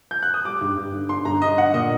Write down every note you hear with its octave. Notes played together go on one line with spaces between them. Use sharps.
G6
F#6
D#6
G3 D6
G2
G2
D3
D3 C6
G2 A#5
D3 D#5
D3 F#5
A#2 D#5